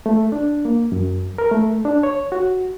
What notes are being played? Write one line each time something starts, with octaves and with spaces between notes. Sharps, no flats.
A3
D4
A#3
F#2
A#4
A3
D4
C#5
F#4